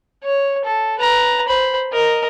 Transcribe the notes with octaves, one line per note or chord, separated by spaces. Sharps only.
C#5
A4
B4 A#5
C5 B5
A#4 D#5